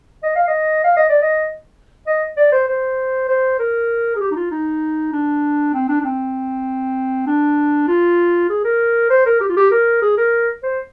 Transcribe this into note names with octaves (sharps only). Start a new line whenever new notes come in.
D#5
F5
D#5
F5
D#5
D5
D#5
D#5
D5
C5
C5
C5
A#4
G#4
G4
D#4
F4
D#4
D4
C4
D4
D4
C4
D4
F4
G#4
A#4
C5
A#4
G4
F4
G4
A#4
G#4
A#4
C5